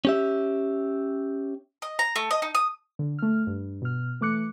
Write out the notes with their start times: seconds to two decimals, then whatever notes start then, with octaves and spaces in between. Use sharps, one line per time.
0.05 C#4 G4 E5
1.82 D#5
1.99 A#5
2.16 A3
2.31 D#5
2.42 D#4
2.55 D#6
2.99 D3
3.19 A3 F6
3.47 G2
3.82 B2 F6
4.21 E3 A3 D6 F#6 C#7